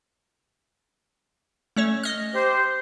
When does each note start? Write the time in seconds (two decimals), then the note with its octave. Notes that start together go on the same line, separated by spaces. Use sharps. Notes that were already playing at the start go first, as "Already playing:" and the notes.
1.76 A3 C#4 C#5
2.03 D#5 F6
2.35 G4 C5